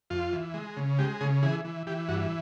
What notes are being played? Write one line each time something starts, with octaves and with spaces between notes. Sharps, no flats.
F2 F4
E3
G#3
C#3
G#3 G4
C#3 G#4
E3 G#4
E3
E3 G4
G2 F#4